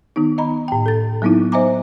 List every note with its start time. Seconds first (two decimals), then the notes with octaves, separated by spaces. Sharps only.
0.16 D#3 B3 D#4
0.38 D#5 A#5 B5
0.68 A2 G5
0.86 A4 A6
1.22 F#3 A#3 B3 D#4 E4
1.52 C5 D#5 E5 G#5 A#5 D6